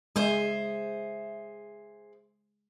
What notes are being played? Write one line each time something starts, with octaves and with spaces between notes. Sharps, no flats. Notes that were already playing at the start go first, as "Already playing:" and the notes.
G#3 G#4 C5 E5